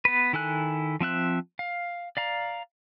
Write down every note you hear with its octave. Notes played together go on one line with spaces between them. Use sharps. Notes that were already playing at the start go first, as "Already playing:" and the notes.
B3 B4
D#3 E4 A4 G#5 F#6
F3 C4 E5 F#6
F5
D5 F5 A#5